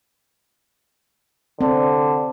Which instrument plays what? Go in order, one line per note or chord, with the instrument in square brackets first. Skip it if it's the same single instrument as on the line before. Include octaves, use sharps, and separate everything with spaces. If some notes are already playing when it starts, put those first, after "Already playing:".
[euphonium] D3 [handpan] C4